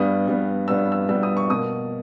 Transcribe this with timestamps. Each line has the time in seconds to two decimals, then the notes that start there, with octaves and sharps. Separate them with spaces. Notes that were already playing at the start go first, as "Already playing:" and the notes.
Already playing: G2 G3 B3 D#6
0.27 G2 G3 B3
0.68 G2 G3 B3 E6
0.92 E6
1.09 G2 G3 B3 E6
1.23 D#6
1.37 C#6
1.49 B2 A#3 D#6